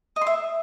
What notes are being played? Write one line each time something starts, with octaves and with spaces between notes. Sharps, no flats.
D#5
C6
E5